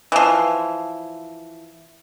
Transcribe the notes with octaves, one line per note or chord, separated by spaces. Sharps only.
E3 F3